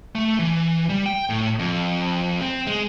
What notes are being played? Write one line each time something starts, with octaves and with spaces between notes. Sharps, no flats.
A3
E3
G3
G5
A2
F2
C4
G#3